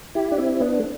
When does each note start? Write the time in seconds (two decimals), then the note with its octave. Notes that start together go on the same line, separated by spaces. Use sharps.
0.15 E4 G4
0.32 D4
0.38 C4 E4
0.60 B3 D4
0.79 A3